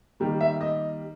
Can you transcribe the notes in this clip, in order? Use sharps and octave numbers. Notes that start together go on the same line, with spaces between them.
D#3 G3 A#3
E5
D#5